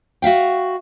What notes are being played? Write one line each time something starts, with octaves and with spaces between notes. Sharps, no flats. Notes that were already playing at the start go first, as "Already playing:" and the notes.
F#4 E5 F5 G5